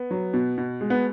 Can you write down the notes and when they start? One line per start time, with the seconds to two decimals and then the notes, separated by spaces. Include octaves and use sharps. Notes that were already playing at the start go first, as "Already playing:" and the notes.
Already playing: B3
0.11 F#3
0.34 B2
0.58 B2
0.81 G#3
0.90 B3